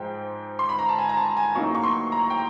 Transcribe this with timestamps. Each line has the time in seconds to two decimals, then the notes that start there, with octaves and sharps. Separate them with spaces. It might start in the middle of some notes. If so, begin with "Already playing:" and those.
Already playing: G#2 F3 G#3 G5
0.59 C6
0.69 B5
0.79 A#5
0.89 A5
0.99 G#5
1.09 A#5
1.17 A5
1.37 G#5
1.55 A2 F#3 A#3 D#4 C#6
1.75 C#6
1.83 C6
2.12 A#5
2.30 G5